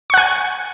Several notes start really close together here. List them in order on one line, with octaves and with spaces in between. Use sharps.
C#6 F#5 G#5